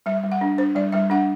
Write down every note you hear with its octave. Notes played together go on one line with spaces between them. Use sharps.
G3 E5
G3
F#5
D4
D4 C5
G3 D5
G3 E5
D4 F#5